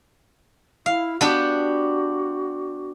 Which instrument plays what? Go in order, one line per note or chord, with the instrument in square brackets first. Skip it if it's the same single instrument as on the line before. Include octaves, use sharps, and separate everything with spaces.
[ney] E4 [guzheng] F5
[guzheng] B3 D4 G4 [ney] F#4